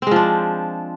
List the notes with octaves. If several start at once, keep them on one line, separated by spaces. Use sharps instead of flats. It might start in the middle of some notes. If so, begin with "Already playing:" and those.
F3 G#3 C4 D4